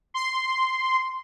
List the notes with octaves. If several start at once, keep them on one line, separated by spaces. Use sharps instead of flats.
C6